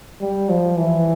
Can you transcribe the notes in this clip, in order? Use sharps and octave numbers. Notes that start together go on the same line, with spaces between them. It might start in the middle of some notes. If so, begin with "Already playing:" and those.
G3
F3
E3